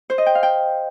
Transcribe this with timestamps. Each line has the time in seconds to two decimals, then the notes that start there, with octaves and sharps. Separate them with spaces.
0.10 C5
0.18 D#5
0.26 G5
0.35 F5
0.43 G5